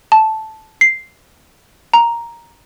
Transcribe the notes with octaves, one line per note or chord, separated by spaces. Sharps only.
A5
C7
A#5